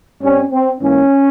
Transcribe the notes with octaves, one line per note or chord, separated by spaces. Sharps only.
G2 G3 C4 C#4
C4
G#2 E3 A#3 C#4